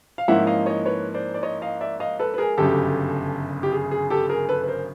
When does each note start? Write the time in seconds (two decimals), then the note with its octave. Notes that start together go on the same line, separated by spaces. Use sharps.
0.18 F5
0.28 G#2 F3 A#3 C#4 E4 E5 F#5
0.47 D#5 F5
0.66 C#5 D#5
0.86 B4 C#5
1.14 C5 D5
1.34 D5
1.43 C#5 D#5
1.62 D#5 F5
1.81 D5 E5
2.00 D#5 F5
2.19 A4 B4
2.34 B4
2.38 G#4 A#4
2.57 G1 F#2 C#3 G4 A4
3.63 G4
3.72 G#4
3.91 G#4
4.10 G4 A4
4.29 G#4 A#4
4.49 A4 B4
4.64 B4
4.68 A#4 C5